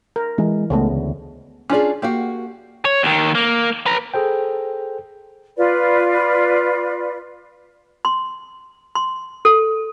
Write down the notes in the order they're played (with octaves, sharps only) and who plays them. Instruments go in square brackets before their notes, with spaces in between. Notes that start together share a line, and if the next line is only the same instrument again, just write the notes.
[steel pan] A#4
[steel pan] E3 [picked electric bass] G#3
[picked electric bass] C#2 A3 [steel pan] C#3 G#3 B3
[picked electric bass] D2
[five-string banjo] C#4 F4 D5 [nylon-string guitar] D4 G#4
[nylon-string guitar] A#3 F#4 [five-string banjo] G4 F5 G5
[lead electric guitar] C#5
D#2 D#3
A#3
B4 A#5
[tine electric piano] G#4 A4 C5 G5
[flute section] F4 B4 D5
[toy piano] C6
C6
A4